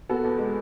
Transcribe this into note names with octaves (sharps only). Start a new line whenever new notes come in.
B3 F#4 A4
E2
G#3